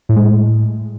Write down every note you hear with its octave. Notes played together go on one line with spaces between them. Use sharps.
A2
G#3
A2